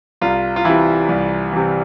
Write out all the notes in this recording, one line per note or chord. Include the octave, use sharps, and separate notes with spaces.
C2 F4
F4
C3 E3 E4
C2
C3 E3